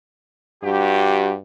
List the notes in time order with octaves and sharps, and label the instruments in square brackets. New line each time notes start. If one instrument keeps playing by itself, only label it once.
[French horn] G2 [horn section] F#4 G4